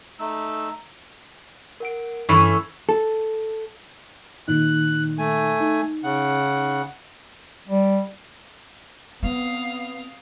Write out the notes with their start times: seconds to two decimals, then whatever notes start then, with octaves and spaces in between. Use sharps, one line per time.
0.19 A3 D#4 E6
1.80 A#4 F#5 D7
2.29 G2 E3 A3 C#4 C#6
2.89 A4
4.48 A#2 D#3 D#4 F#6
5.18 A3 G#5
5.60 D#4
6.04 C#3 F#5
7.68 G3
9.23 B3 C4 F5 D#6